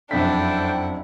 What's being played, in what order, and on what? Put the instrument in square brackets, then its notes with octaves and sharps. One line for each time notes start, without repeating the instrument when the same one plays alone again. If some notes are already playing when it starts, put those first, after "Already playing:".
[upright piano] F#1 F2 B6 [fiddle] D4 [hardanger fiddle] E4 F#5 [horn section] A4 G5